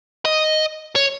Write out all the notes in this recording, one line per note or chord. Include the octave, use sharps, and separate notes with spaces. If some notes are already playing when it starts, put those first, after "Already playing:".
D#5
C#5